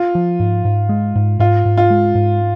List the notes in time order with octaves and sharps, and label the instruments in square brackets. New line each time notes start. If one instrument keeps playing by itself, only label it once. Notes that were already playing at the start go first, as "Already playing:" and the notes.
Already playing: [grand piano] F4
[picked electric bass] F3
G#2
G#2
G#3
G#2
[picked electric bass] G#2 [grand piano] F4
[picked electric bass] G#2
[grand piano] F4
[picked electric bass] G#3
G#2